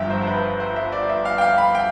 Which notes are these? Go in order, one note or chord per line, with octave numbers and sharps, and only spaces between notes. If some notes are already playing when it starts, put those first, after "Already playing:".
Already playing: G1 G2 F3 E5 G5
C5
C5
B4
C5
E5
D5
E5
F5
G5
F5
B5
G5